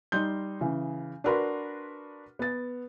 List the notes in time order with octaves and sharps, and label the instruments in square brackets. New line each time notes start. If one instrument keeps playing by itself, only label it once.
[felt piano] G3 D#4 C6 G6
C#3 E3
D4 F#4 A#4 B4 B5 C6
B3 A6